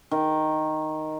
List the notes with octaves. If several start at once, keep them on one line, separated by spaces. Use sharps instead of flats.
D#3